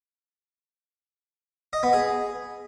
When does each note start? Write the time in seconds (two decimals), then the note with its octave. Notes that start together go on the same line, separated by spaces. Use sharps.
1.73 D#5
1.83 B3
1.93 G#4